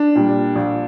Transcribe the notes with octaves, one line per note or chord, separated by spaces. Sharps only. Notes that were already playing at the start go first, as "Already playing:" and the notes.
Already playing: D4
A#2 G3
A#1